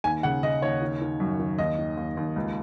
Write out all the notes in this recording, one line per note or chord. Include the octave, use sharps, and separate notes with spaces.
D#2 G#5
C#3 F#5
C#3 D#5
D#2 C#5
D#3
D#3
F#2
D#3
D#2 D#5
D#3
D#2
D#2
C#2